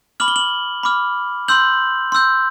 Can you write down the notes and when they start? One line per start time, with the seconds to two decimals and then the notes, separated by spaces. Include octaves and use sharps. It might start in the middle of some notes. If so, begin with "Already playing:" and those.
0.20 B5 D6 F6 F#7
0.28 G7
0.36 F#7
0.83 B5 D6 F6
1.48 C6 E6 G6 F#7
2.12 C6 E6 G6